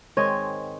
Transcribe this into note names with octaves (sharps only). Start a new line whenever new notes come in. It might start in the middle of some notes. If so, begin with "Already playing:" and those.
G#2 D#3 G#3 C4 C#5 D#5